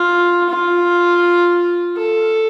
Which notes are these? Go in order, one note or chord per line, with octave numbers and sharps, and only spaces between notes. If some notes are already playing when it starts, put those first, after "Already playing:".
Already playing: F4
F4
A4